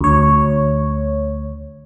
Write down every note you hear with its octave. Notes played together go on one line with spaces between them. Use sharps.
D2 C#5